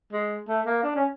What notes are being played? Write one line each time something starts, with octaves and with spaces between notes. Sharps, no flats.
G#3
A3
A#3
D4
C#4